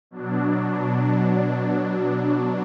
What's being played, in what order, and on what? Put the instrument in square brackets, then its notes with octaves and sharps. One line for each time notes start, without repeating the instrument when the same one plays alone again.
[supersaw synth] B2 F#3 D4